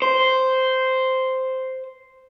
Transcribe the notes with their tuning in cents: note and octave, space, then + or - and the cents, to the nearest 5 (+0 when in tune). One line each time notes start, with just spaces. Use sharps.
C5 -5